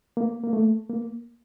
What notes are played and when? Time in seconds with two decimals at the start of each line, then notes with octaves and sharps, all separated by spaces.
0.17 A#3
0.44 A#3
0.53 A3
0.89 A#3